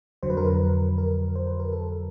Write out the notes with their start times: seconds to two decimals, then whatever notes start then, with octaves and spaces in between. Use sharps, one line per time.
0.23 F2 D3 F#3 C5
0.30 B4
0.37 A#4
0.45 B4
0.98 A#4
1.35 C5
1.47 B4
1.60 A#4
1.72 A4